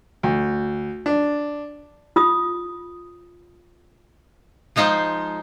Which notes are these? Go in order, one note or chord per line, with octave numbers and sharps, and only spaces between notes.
D2
D4
F4 D#6
F3 G#3 D#4 F4 C5